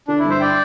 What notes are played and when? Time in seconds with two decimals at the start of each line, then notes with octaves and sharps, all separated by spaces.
0.08 D3 D4
0.19 G2 E4
0.30 C5 E5
0.40 D5 G5